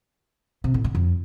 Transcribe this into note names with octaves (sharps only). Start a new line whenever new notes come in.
C3
A2
D3
F2